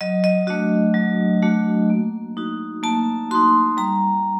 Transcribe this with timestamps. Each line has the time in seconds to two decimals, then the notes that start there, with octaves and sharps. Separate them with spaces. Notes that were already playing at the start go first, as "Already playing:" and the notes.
0.01 F#3 D#5
0.24 D#5
0.47 A3 D4 F#4 D#5
0.94 F#3
1.42 A3 D4 F#4
1.90 A#3
2.37 D#4 F#4
2.83 A#3 A5
3.31 D#4 F#4 C6
3.77 G3 A#5